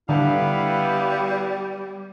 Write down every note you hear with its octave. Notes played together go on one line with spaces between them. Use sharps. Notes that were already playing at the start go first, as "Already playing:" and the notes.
D3 G3 B3 E4 F5